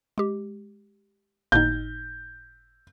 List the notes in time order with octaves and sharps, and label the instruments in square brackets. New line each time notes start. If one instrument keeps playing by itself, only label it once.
[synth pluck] G#3 G4
[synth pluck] G1 A2 D#4 [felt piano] G6